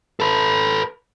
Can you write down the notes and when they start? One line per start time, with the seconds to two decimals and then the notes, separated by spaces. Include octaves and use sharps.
0.20 A4 B4